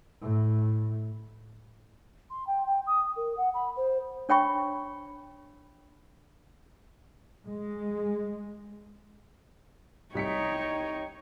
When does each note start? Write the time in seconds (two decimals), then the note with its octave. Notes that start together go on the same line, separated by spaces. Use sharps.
0.23 A2
2.30 C6
2.47 G5
2.66 G5
2.86 D#6
3.16 A#4
3.37 F#5
3.53 B5
3.76 C5
4.29 D4 C#5 G5 B5 C#6
7.47 G#3
10.15 C2 D#4 C#5 G5 B6 C#7